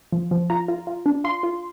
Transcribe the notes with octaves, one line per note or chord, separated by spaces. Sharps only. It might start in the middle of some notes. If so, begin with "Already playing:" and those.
F3
F3
F4 A#5
F4
F4
D4
F4 C6
F4